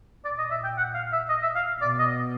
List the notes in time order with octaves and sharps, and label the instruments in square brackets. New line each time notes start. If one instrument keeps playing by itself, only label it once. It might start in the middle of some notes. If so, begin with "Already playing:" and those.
[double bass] A#2 [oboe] D5
[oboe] D#5
E5
G5
F#5
F5
E5
D#5
E5
F5
[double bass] B2 [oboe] D5
[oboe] D#5